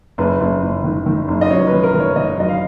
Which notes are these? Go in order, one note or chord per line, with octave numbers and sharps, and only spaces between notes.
F#1 B4
F#1
F#1
D#3
D#3
F#1
D#5
F#2 C#5
B4
D#3
A#4
D#3
C#5
D#3 D#5
F#2 D#5
F5